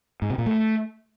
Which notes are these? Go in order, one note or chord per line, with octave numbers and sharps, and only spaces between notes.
G#2
C3
A#2
A3